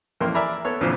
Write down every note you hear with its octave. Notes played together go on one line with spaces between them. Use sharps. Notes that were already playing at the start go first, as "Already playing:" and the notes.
A1 F2 A#3 G5 C6
A#4 D5 E5 G#5 A#5 B5
B3 A4 C#5
D2 A#2 D3 E3 F3 C4